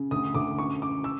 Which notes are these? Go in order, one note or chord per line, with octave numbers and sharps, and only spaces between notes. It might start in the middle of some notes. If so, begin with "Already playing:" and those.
Already playing: C#3
D2 D#6
D2 D6
F#2 C#6
F#2 D6
E6